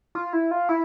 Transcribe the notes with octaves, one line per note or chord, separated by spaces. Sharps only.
F4
E4
F4
E4